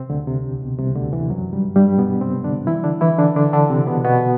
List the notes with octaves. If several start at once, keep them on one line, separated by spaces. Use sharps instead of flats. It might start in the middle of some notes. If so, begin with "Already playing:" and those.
Already playing: C3 C4
D2 D3
C2 C3
B2
C2 C3
D2 D3
E2 E3
F#2 F#3
G2 G3
G2 G3
B2 B3
C3 C4
D3 D4
E3 E4
D3 D4
E3 E4
D3 D4
D3 D4
D3 D4
C3 C4
B2 B3
B2 B3